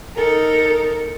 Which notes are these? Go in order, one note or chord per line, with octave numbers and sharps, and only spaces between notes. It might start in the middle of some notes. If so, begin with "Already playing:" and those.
D#4 A4 A#4